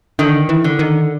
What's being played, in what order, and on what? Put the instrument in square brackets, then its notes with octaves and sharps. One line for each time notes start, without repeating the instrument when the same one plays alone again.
[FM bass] D3 [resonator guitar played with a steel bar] D#3
[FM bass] E3
[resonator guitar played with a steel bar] D3
[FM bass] D#3